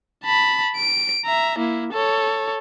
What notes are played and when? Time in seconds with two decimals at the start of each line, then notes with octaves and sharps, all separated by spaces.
0.24 A5 B5
0.77 D7
1.25 E5 A#5
1.58 A#3 E4
1.92 A4 C#5